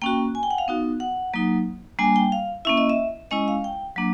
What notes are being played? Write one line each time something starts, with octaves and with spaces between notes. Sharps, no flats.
A#3 C#4 F#4 G5
G#5
G5
F#5
F5
B3 D#4 F#4
F#5
F#3 A#3 D#4
G3 A#3 D4 G#5
G5
F5
A#3 C#4 E4 E5
D#5
E5
G#3 C#4 E4 D#5
F5
G5
F#3 A#3 D4